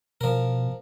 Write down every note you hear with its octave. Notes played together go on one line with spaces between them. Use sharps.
B2 F3 A#4